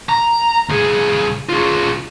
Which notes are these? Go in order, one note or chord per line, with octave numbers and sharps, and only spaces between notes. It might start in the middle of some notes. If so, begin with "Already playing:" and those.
A#5
C2 G#4
F4 G#4